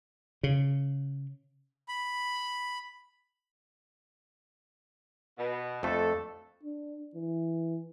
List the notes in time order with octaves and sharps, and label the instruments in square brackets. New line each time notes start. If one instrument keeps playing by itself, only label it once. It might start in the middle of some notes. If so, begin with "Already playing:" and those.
[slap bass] C#3
[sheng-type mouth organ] B5
[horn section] B2
[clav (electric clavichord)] F2 A3 D4 [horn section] A4
[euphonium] D4
E3